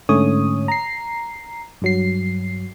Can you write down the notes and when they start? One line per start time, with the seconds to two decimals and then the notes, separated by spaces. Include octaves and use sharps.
0.09 G#2 D3 A3 C#4 C#5 D#6
0.68 A#5 C7
1.82 G2 F#3 C7